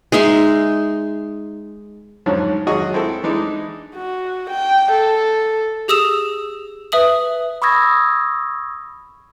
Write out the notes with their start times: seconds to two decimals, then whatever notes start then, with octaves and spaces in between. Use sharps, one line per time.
0.12 G#3 D#4 E5 C6
2.26 G#2 D3 F3 F#3 C#4
2.67 G#1 F#3 F#4 G#4 D#5
2.94 C4 E4 A4
3.23 E3 G#3 D4 D#4
3.96 F#4
4.50 G5
4.92 A4
5.88 G4 G#4 D#6 E6 E7 F7
6.92 B4 E5 D#6 F#7
7.62 B5 C#6 D#6 E6 G#6 A#6